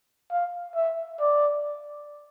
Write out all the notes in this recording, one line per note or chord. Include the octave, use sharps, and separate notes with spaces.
F5
E5
D5